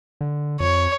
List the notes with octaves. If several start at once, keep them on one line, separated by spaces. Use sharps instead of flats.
D3
F2 C#5